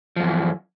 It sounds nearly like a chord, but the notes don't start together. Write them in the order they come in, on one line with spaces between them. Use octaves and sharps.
F3 F#2 E3